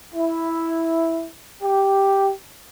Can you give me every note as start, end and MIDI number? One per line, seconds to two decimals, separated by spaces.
0.14 1.27 64
1.62 2.30 67